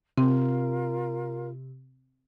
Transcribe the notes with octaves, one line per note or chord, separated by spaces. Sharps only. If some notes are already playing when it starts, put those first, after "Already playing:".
C3 C4 F4 A#4